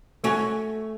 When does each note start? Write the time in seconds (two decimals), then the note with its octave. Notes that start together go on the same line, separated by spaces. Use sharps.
0.24 A3 C#4 F#4